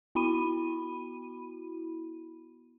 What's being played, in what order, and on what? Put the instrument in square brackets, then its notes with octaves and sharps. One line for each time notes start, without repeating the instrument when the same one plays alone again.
[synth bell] B3 E4 F#4 B5 D#7